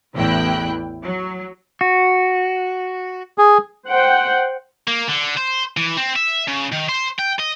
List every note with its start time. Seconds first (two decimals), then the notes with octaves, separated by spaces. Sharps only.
0.14 A1 E2 E4 G5 F#6
1.02 F#3
1.81 F#4
3.38 G#4
3.86 C5 F#5 G5
4.87 A#3
5.09 D3
5.37 C5
5.77 E3
5.97 C4
6.16 E5
6.48 C#3
6.72 D#3
6.89 C5
7.19 G5
7.39 D#5